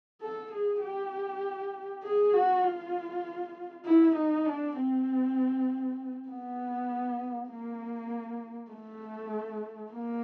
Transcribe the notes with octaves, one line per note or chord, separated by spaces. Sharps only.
A4
G#4
G4
G#4
F#4
F4
E4
D#4
D4
C4
B3
A#3
A3
A#3